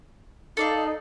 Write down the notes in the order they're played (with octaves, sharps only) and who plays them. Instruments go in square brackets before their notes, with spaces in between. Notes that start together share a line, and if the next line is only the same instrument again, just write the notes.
[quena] D#4 [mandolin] A4 D5 F5